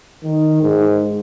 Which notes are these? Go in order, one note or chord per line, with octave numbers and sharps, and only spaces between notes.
D#3
G#2